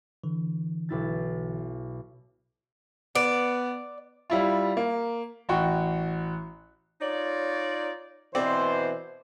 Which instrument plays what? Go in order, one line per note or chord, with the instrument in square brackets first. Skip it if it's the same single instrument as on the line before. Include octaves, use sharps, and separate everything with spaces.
[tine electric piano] D3 E3
[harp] B1 E4 A6
[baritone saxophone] B3 [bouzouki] D5
[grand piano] G3 E4 F4
A#3
A1 F#4 G5 C#6
[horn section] D#4 F4 D5 [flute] C#5
[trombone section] B2 E3 C5 [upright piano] C4 D5